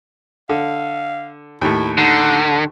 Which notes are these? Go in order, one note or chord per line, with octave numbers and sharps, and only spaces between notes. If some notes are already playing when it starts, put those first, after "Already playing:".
D3 F5
D#2 A2 E4
D3 D#4